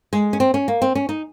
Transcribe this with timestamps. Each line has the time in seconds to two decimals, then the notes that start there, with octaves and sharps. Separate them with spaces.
0.13 G#3
0.33 C#4
0.40 C4
0.54 C#4
0.68 A#3
0.82 C4
0.95 C#4
1.09 D#4